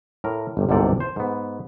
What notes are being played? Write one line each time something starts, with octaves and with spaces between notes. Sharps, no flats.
A2 A#4
G1 C3
G1 C2 G#2 C3 A4 D5
C5
G#2 B3